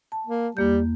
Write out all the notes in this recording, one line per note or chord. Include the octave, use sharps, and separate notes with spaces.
A5
A#3
E2 G3 A#3 G6